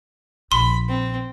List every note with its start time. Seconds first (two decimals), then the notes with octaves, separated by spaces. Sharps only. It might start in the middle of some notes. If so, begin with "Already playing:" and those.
0.52 A#1 B5 C6
0.88 C4